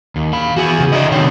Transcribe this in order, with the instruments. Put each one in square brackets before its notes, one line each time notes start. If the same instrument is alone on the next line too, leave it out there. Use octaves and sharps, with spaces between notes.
[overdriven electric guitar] D#2
F5 B5
[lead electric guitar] E2 G#4 [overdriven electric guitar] F#4
[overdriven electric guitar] C#3
[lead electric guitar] D3 D#5 [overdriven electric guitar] E4 D5
[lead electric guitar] C3 D#3 [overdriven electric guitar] C#5 G5